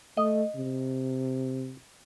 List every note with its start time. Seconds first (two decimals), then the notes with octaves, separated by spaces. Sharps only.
0.17 A3 D#5
0.55 C3